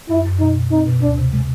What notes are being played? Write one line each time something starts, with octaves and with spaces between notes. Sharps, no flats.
F#2 E4
F#2
B2 D#4
B2
C4 D#4
B2
D2 D4
C3
G#3